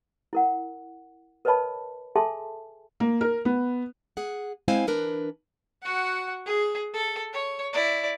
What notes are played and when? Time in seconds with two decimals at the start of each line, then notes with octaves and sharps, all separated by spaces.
0.33 E4 A#4 F#5
1.45 A#4 B4 C#5 D#5 A5 B5
2.16 G#4 A4 E5 G#5 A5 C6
3.00 A#3
3.21 A#4
3.45 B3
4.17 G#4 F#5
4.68 G#3 C4 E4 C5 F5 G#5
4.87 E3 D4 A#4 B4
5.82 F#4 F#5
6.46 G#4
6.93 A4
7.33 C#5
7.73 E4 D5